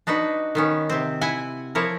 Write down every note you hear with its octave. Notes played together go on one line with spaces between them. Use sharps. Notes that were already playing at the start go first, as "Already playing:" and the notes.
D4 D#4 F#4 B4
D#3 B3 C#4
C3 C4
E4 F#5 G#5
F3 E4 A#4 C#5